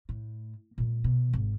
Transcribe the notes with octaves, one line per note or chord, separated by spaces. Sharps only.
A2
A#2 G#3
B2
G#1